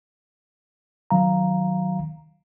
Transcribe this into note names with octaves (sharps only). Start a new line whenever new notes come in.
D#3 F#3 F5 A#5